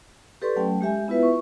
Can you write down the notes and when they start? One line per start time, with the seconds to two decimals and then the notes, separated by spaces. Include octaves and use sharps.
0.42 G4 A4 B4 D5 C6 C#6
0.56 F#3 A3 C#4 G5
0.81 G#3 G4 E5 G#5
1.08 B3 E4 F4 B4 E5
1.23 C#6